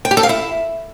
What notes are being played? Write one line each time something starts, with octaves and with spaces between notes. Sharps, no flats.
G5
G4
A4
F5
E4